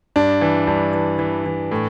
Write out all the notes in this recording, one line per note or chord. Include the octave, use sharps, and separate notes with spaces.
G2 D4
E3
G2
E3
E3
E3
A2